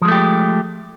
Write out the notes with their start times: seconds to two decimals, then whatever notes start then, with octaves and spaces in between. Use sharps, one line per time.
0.02 F3
0.05 G#3
0.08 A3
0.12 G4